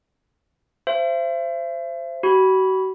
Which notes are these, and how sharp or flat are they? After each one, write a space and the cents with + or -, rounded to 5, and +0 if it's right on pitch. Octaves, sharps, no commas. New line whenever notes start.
C5 +0 E5 +40
F#4 +35 B5 -10